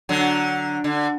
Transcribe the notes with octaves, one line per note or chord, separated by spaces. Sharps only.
D3 F#3
D3